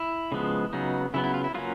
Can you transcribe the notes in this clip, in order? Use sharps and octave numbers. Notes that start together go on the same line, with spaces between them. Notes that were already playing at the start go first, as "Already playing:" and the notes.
Already playing: E4
C#3 F3 G#3 B3
C#3 F#3 B3 D#4
C#3 F#3 B3 E4
E4
F4
E4
F#3 A#3 C#4 F4